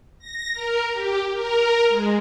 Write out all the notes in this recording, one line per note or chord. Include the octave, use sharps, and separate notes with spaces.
A#6
A#4
G4
A#4
G#3